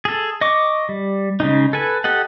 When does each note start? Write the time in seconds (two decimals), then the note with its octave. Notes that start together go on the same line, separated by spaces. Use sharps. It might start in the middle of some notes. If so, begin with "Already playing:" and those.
0.05 G#4 A4
0.41 D#5 C#6 D6
0.89 G3
1.40 C#3 G#3 D#4
1.73 A4 B4 G#5
2.04 G4 A4 D#5 F#5